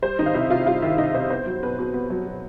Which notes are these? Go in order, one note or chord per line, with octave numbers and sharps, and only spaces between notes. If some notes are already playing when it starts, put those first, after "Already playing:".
G3 C5
D#3 D#4 D#5
F5
C3 E4 E5
C3 F4 F5
G3 F4 F5
D#3 E4 E5
C3 D#4 D#5
C3 C5
B3 C5
F#3
B2 B4
B2
B3
F#3
B2